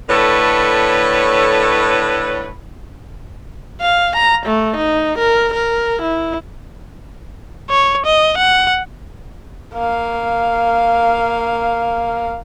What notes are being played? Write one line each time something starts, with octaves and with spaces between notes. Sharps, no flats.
A2 D3 A4 B4 C#5
F5
A#5
A3
D#4
A#4
A#4
E4
C#5
D#5
F#5
A#3 F5